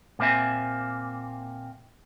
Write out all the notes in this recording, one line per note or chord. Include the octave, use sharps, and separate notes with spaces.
A#2 A#3 C4 E5 G#5